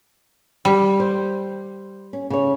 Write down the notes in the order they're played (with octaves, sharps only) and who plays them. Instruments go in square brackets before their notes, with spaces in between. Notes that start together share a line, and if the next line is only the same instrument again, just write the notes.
[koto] G3
[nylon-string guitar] C5
C#4
C#3 C#5